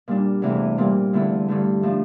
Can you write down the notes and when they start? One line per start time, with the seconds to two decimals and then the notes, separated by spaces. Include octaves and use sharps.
0.08 A#2 G3 D4
0.42 E2 C3 E3 A3
0.77 A#2 G3 C4
1.13 E2 D3 A3 E4
1.48 G2 D3 A3
1.83 A2 F3 A3 D4